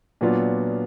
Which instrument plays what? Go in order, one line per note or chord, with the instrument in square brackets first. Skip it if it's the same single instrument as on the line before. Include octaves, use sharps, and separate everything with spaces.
[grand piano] A#2 F#3 B3 D4 F4